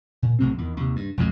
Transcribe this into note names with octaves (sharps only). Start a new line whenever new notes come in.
A#2
B1 A2 C3 C4
E2 D#3
D#2 C3
G2
B1 F2 A2 G#3